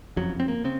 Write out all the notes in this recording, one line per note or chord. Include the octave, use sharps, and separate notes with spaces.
F#1 F2 C#3 F#3
C4
A#3
C#3 C4